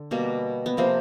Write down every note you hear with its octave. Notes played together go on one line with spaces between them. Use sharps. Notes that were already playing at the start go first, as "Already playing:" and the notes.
Already playing: D3
B2 G3 A#3
B3
C3 F3 A#3 C4